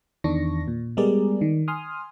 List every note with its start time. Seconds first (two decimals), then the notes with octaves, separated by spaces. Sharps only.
0.24 E2 D#3 D4 C#6 A#6
0.68 A#2
0.97 G3 G#3 B3 G#4 A#4 D5
1.41 D#3
1.68 G#5 C6 D#6 F6